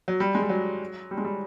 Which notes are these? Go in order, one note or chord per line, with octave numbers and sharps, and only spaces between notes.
F#3
G3
G#3
G3
F#3
G3
G#3
G3